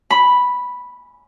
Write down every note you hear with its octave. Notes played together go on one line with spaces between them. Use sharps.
B5